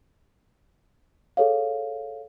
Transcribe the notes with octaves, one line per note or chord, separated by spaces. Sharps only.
G#4 A4 C#5 F5